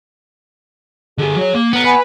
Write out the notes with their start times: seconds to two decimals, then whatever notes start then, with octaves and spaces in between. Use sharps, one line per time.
1.18 D3 G4 G#4
1.37 F#3 C#5
1.55 A#3
1.73 B3 B4 A#5
1.84 B4 F#5 G#5 B5